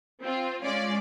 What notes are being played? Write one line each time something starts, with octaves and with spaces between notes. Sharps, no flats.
C4 F4
G#3 C#4 F4 D5